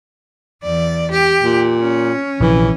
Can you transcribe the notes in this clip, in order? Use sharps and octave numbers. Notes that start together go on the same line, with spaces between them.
E2 D5
G4
A#2
C#4
A#1 C3 E3